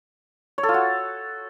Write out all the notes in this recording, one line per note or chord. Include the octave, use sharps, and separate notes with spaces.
C#5
A4
F4
F#4